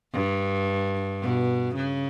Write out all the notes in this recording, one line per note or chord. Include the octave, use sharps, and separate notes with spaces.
G2
B2
C#3